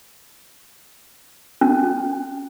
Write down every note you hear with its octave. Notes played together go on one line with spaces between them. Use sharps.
C#4